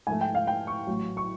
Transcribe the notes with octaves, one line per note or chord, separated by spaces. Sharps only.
G#2 F3 A3 G#5
G5
F5
G5
C#6
A1 A2 F#3
C#6